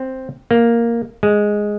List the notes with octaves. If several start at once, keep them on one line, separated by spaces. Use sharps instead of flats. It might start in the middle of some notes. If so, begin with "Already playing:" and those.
Already playing: C4
A#3
G#3